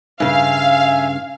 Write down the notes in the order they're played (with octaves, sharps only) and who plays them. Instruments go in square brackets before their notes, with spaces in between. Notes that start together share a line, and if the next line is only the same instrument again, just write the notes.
[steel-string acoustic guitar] G2 C#3 [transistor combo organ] E5 G#5 [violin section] F5